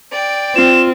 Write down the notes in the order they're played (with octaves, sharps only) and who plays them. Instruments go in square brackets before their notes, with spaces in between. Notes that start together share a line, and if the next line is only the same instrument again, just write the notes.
[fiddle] D5 G5
[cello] C4 [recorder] F4 [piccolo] E7